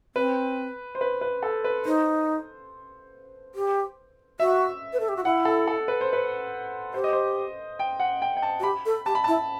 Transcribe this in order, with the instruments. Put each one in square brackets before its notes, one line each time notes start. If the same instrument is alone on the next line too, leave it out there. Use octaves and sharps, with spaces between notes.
[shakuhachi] C4 [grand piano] B4
[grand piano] C5
B4
B4
A4
B4
[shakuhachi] D#4 [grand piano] C5
[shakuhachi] G4
[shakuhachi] F#4 [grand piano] E5
[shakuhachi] B4
A4
G4
F#4
[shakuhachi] E4 [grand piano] F#5
[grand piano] A4
A4
B4
C5
B4
[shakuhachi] G4 [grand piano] C5
[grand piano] D#5
C5
G5
F#5
G5
G5
A5
[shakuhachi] F#4
[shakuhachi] G4 [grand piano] B5
[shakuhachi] A4
[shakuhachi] G4 [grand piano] A5
[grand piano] B5
[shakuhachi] E4 [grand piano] A5